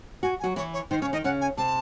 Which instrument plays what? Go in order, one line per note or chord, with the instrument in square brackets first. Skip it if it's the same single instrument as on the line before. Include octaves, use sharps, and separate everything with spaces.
[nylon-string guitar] F#4 [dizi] G#5
[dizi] G#5
[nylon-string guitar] F#3 F#4
[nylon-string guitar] E3 E4 [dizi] C#5
[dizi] C#5
[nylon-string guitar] D#3 D#4 [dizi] C5
[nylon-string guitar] C#3 C#4 [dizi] C#5
[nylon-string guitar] D#3 D#4 [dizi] D#5
[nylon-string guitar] C#3 C#4 [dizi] F#5
[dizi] G#5
[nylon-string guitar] C3 C4 [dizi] A5